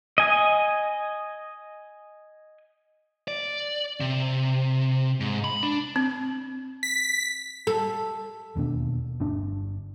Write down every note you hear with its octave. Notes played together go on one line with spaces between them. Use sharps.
D#5 G#5
D5
C3
G#2
B5
D4
C4
B6
A4
E1 D#2 B2 D4
G1 D4